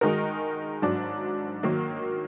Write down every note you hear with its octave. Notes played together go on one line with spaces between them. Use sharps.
D#3 G#3 D#4 F#4 A#4
G#2 F#3 D4
D#3 F#3 A#3